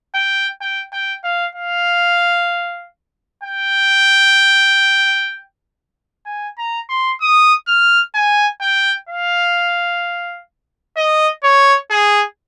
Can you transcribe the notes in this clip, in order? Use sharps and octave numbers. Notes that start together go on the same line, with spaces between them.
G5
G5
G5
F5
F5
G5
G#5
A#5
C6
D#6
F6
G#5
G5
F5
D#5
C#5
G#4